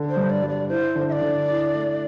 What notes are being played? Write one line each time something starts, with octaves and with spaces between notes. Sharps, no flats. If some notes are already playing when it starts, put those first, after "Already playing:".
Already playing: D3
C5
G2
D5
G3
D5
E4 C5
D3
E5
D5
D3
E4
A3